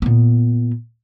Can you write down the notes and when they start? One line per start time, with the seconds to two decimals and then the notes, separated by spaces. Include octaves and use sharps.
0.02 A#2 B3